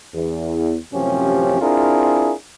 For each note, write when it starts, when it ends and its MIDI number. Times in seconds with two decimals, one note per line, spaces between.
0.14 0.77 40
0.93 1.58 33
0.93 1.58 42
0.93 1.58 48
0.93 1.58 53
0.93 1.58 61
0.93 1.58 67
1.61 2.33 60
1.61 2.33 62
1.61 2.33 64
1.61 2.33 65
1.61 2.33 68
1.61 2.33 70